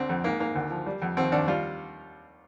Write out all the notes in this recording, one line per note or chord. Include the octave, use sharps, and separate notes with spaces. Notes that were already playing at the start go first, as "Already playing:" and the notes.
Already playing: D2 D3 C4
F2
G#2 A#3
G#2 A#3
D2
F3
G3
F2
D#2 C4
D#2 D4
G3 F4